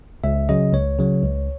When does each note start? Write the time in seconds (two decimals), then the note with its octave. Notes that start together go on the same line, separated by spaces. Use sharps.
0.24 C#2 E5
0.49 C#3 F#3 D#5
0.73 C#2 C#5
0.98 C#3 F#3
1.23 C#2